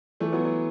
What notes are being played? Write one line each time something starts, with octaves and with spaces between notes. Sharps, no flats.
E3 A3
F#3 B3
F#3